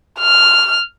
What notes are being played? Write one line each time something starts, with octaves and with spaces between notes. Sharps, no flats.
F6